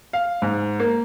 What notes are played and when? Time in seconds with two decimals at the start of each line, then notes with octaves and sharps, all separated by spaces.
0.13 F5
0.42 G#2
0.80 A#3